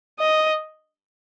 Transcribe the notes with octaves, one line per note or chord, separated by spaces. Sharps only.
D#5